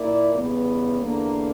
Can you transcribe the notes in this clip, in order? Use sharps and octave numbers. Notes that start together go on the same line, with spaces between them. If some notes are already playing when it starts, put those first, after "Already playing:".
Already playing: A#2 A#3 E4 A#4 D5
E2 C#3 G3 B3
E2 D3 A#3